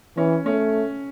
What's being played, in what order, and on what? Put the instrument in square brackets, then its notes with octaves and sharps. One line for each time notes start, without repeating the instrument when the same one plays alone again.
[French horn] E3 [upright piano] C#4
[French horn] A3 [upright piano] C#4